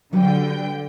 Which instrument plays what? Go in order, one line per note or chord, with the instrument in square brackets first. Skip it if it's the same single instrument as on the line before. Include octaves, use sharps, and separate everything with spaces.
[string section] D3 G5 [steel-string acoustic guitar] F#3 G3 B4